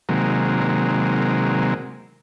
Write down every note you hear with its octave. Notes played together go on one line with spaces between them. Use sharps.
C3 D#3 F#3 G#3 A#3